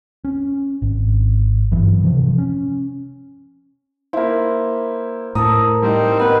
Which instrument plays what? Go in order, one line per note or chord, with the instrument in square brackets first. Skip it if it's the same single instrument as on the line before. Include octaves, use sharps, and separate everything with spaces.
[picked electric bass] C#4
G#1
G2 E3 F#3
C3 F3
C#4
[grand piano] A#3 E4 [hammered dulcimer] C5 B5
[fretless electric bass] A2 [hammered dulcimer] A4 A#4 A#5 [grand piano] D#6
[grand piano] G3 D#4 [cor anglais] C4
[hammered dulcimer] D#3 B3 [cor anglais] B4